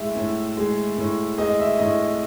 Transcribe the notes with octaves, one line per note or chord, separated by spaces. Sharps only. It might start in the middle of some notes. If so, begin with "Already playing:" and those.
Already playing: A2 G#3 E5
A2
G#3
A2
G#3 D#5
E5
A2 D#5